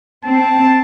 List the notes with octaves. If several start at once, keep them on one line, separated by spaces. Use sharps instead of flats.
C4 A5